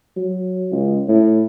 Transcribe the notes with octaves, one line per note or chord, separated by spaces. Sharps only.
F#3
C#2
A2